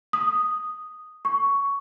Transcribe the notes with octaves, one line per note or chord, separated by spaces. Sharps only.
D#6
C#6